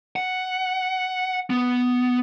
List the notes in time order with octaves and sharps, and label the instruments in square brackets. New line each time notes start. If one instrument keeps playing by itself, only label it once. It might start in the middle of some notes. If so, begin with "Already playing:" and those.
[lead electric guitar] F#5
B3